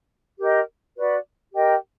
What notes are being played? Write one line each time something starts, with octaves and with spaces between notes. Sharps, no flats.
G4 A#4 D#5
F#4 B4 D5
G4 A#4 D#5 G5